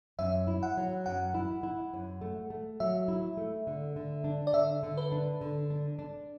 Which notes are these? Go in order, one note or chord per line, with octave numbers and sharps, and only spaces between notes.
F#2 E5
E4
F#5
F#3
F#2 F#5
E4
E4
F#2
A3
A3
F#3 E5
E4
A3
D3
D3
D4
D5
D3 E5
D3
B4
D4
D3
D4
D4